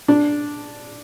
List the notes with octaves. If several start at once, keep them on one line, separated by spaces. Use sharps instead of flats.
D4